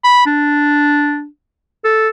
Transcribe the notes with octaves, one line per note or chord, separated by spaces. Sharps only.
B5
D4
A4